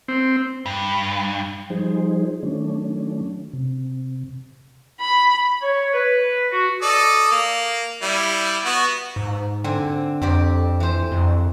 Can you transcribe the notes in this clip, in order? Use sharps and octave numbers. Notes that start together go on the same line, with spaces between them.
C4
G2
F3 G3 D#4 G#4 C5
D#3 F#3 A3 C#4 D4
C3
B5
C#5
B4
F#4
A4 D5 D#5
A#3
G3 E4
B3 F#4
G#2
D3 C4 G#5
F2 C4 G4 D5
E3 C5
F2